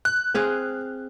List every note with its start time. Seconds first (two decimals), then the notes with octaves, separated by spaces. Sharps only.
0.05 F#6
0.34 C4 G#4 F5